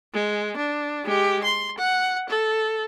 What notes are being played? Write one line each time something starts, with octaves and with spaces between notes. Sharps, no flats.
G#3
D4
G#3 G4
C6
F#5
A4